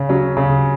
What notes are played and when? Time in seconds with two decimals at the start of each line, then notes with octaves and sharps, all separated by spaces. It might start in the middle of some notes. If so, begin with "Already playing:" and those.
Already playing: C#3
0.09 F#3 C#4
0.37 C#3